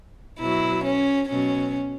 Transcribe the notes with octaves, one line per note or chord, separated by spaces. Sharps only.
B2 F#3 E4
C#4
B2 F#3 C#4